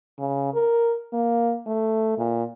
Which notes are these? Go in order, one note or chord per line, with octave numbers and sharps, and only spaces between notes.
C#3
A#4
A#3
A3
A#2